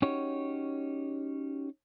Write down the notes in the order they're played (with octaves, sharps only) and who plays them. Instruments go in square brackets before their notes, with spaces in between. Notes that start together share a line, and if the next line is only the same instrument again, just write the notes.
[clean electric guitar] C#4 D#4 F#4 G4 C#5